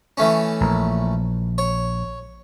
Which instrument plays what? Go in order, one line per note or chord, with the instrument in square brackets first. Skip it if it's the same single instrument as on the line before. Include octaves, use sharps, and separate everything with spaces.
[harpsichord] E3 A3 C#4
[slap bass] A#1
[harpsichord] C#5